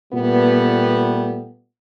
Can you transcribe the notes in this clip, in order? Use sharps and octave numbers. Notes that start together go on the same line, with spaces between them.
A#2 G3 A3 B3